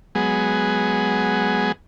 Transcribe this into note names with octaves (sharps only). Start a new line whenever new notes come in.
F#3 G#3 B3 G#4